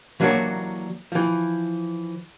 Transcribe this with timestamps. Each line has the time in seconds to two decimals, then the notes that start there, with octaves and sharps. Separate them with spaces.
0.20 E3 F#3 A#3 D4 F#4 C#5
1.12 E3 F3